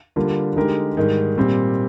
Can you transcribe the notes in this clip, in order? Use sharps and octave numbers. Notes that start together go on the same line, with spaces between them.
D3 G3 A#3 D4 F4
D3 G#3 D#4 G4 A#4
G#2 D#3 G3
A#2 G3 C4